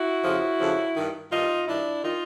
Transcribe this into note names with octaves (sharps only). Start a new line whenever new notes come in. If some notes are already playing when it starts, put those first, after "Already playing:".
Already playing: E4 F#4
F2 C#3 F3
F2 C#3 F3
G2 D#3
G2 D#3 D#4 F4
G2 D#3 D4 E4
D#3 D#4 F4